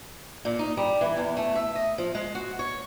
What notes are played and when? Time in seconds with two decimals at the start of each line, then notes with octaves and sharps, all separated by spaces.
0.45 A#2
0.59 D#4
0.77 G3
1.01 E3
1.17 E2
1.37 A3
1.56 E5
1.75 D#5
1.98 F3
2.15 G#3
2.35 F#4
2.59 C#5